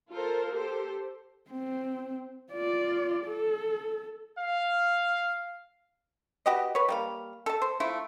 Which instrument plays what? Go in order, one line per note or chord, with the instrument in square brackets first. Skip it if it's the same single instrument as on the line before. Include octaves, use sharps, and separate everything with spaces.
[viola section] F4 A4 A#4 C5
G4 A4 C5
[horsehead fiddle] C4
F4 D5
A4
[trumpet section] F5
[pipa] F#4 G4 B4 D#5
B4 C#5
G3 A#3 F5
A4 A5
C5
A3 E4 F4